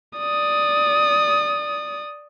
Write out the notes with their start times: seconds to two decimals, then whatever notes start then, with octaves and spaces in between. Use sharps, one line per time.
0.19 D5 D#6